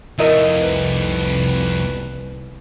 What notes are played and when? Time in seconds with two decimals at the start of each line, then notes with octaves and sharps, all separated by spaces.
0.18 F2 A3 E4 A#4 D#5
0.61 C2 B4